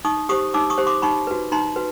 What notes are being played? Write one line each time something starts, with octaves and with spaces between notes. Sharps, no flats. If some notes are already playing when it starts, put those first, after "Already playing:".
D#4 C#6 D#6
G4 C5 C#6 D#6
D#4 D6 E6
C#6 D#6
G4 C5
C6 D6
D#4 B5 C#6
F#4 B4
D#4 A#5 C6
F#4 B4